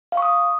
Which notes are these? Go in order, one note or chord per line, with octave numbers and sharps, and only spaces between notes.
F5
C#6
D#6